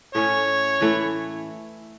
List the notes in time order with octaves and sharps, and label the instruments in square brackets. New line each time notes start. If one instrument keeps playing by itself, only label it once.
[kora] A2 A3 C#4 [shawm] C#5
[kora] E3 A3 E4